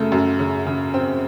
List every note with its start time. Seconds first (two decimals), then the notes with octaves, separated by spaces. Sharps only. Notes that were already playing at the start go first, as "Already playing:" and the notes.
Already playing: F#2 C#3 A3
0.12 F#2
0.39 C#3
0.66 C#3
0.94 C4